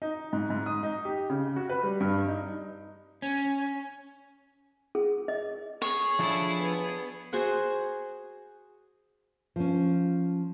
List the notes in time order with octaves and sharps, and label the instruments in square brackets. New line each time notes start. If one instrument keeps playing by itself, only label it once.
[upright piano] D#4
G#2
G#2
D#6
D#4
G4
C#3
F#4
B4
G3
G2
D#4
[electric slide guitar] C#4
[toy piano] G#4
D#5
[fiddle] G#4 [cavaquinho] C#5
[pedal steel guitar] F3 D4 A4 [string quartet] E4
[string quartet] B3
[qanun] F#4 G#4 C5 F#5
[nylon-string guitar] F3 C#4